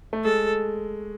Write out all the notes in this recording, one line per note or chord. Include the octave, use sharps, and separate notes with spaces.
A3
G#3 A4